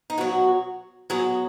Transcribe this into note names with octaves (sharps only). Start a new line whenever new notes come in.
D#4
B2 F#3 F#4
B2 F#3 G#4